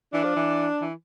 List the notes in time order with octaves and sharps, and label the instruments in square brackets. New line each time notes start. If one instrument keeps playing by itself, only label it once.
[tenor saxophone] E3 [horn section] D4
[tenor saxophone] F3
E3
E3